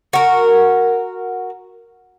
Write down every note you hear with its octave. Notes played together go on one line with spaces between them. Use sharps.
F#4 A#4